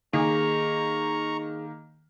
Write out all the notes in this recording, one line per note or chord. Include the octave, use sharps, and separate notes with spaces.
D#3 A#3 G#4 A#5 C#6